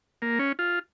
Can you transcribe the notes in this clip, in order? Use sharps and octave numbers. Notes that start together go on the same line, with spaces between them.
A#3
C#4
F4